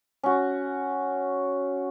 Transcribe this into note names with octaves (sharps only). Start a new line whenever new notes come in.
C#4 F#4